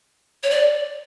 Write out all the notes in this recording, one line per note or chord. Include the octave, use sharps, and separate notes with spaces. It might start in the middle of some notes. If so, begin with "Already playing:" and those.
C#5
D5